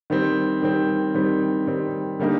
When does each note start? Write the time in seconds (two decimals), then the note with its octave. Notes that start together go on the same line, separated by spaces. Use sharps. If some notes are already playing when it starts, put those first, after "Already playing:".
0.10 D#3 G3 C4
0.62 D#3 G3 C4
1.14 D#3 G3 C4
1.67 D#3 G3 C4
2.19 D3 G3 A#3 D#4